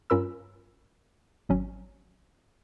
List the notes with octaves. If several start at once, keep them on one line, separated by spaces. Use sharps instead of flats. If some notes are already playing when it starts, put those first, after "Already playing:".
G2 C#4 F4 A#4 B5 E6
G#1 F#3 C#4